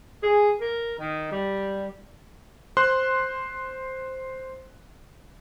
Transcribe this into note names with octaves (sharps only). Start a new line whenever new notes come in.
G#4
A#4
D#3
G3
C5 C6 F#6